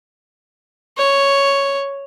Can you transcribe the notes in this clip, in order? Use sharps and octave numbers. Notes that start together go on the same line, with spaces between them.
C#5